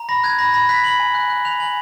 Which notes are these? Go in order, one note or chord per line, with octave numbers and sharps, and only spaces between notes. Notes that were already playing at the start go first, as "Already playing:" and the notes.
Already playing: A#5
B5 A#6
F#6 G#6
B5 A#6
B5 A#6
F#6 B6
B5 F#7
G#5
F#6
F#6
F#6 F7
G#5 F#7